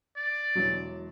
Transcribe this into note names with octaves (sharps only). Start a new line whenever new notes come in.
D5
E1 E3 F#3